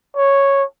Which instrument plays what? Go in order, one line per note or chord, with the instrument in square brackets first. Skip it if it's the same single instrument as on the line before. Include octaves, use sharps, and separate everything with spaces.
[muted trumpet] C#5